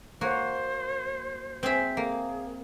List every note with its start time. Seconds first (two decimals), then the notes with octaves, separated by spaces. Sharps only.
0.21 A#3 F#4 C5 C#5
1.63 C4 G#4 E5
1.97 A#3 G#4